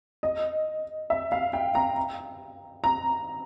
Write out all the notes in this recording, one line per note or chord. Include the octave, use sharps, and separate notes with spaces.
D#5
E5
F5
G5
A#5
A#5